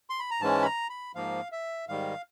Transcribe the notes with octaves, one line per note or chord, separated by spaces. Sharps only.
C6
B5
A#5
G#2 E3 G#3 C#4 A5
B5
A#5
B5
G#2 F3 A#3 F5
E5
G#2 D#3 G3 F5